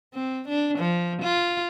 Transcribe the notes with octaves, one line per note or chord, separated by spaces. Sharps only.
C4
D4
F3
F4